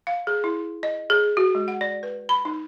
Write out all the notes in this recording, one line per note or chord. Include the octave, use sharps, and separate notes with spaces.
F5
G#4
E4
D#5
G#4
F#4
G#3
F#5
D5
B4
B5
D#4